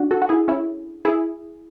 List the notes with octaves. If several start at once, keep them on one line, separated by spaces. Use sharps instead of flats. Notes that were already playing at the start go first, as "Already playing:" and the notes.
Already playing: D4 F#4
F#4 A4
F#4
E4 G#4
C#4 E4
E4 G#4